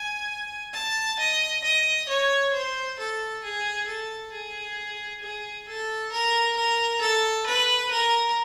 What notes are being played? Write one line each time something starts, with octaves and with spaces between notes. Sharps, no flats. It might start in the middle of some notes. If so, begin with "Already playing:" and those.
Already playing: G#5
A5
D#5
D#5
C#5
C5
A4
G#4
A4
G#4
G#4
A4
A#4
A#4
A4
B4
A#4